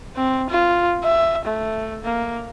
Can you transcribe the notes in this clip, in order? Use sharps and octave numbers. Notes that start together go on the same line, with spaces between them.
C4
F4
E5
A3
A#3